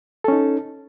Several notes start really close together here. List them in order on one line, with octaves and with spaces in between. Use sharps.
A4 C#4 D#4